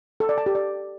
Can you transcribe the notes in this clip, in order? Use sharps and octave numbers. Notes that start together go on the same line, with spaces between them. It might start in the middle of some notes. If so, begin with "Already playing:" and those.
A4
D5
A5
G4
D5